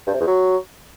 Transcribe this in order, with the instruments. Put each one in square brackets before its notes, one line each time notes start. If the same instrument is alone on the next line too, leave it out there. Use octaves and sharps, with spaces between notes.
[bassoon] G2
C3
E2
F#3